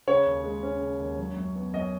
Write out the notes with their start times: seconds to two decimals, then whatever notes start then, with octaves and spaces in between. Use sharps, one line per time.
0.07 C#3 C#5
0.26 D#2
0.44 G#3
0.63 C#4
0.81 C#3
1.00 D#2
1.19 F#3
1.37 F#2
1.55 B3
1.74 F#2 D#5